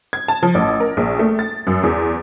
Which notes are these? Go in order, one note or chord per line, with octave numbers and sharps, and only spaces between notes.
G#6
A5
F3
A1
A#4
A#1
A3
A6
F#2
E2